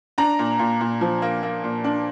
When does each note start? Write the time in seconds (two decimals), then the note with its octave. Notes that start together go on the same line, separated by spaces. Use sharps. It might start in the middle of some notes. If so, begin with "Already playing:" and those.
0.18 D4 A#5
0.39 A#2
0.59 A#2
0.81 A#2
1.01 F3
1.22 A#3
1.43 A#3
1.64 A#2
1.84 D4